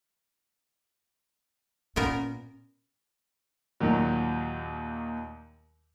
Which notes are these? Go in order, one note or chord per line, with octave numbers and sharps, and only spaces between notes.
A#2 B3 C#4 A#4
D#2 A#2 D#3 F#3